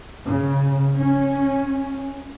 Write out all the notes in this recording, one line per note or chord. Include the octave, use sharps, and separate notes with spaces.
C#3
C#4